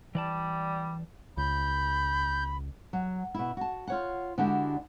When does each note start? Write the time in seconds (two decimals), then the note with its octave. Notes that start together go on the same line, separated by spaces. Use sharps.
0.15 E3 G3 D5 A5
1.37 C#2 B5 G6
2.93 F#3
3.34 B2 E4
3.57 F#4 A5
3.88 F4 C#5 F#5
4.38 D3 G#3 D4 E4 F#4 G4